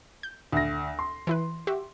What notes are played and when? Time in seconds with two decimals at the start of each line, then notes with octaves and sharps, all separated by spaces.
0.23 G6
0.52 D2 A#6
0.99 C6
1.27 E3 E4 B4
1.67 F#4 G4 E5